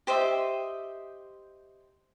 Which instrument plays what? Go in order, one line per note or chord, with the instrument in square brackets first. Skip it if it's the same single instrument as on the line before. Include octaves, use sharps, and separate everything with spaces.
[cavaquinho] G4 C5 D#5 E5